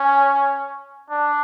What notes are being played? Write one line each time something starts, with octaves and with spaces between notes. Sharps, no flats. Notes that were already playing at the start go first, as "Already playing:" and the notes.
Already playing: C#4
D4